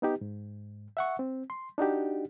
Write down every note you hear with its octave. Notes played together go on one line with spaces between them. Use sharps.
B3 D#4 G4
G#2
E5 F#5 C#6
C4
C6
D4 D#4 F#4 G4